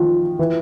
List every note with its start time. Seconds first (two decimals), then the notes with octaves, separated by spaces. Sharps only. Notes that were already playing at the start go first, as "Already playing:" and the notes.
Already playing: D#3 F3
0.39 E3